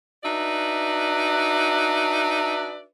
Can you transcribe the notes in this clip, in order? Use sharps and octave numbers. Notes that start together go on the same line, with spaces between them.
D4 D#4 F#4 B4 D5 E5